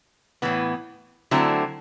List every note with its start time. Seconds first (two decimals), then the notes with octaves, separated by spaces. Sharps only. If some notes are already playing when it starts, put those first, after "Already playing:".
0.42 A2 E3 B3
1.31 D3 F#3 A3 C4 E4